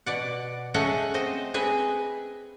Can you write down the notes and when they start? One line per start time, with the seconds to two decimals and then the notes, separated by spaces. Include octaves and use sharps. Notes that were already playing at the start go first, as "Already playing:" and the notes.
0.06 B2 D5 F#5
0.74 A3 C#4 G#4 A4 D#5 F#5
1.14 C4 C5 D#5
1.54 C4 G#4 B4 D#5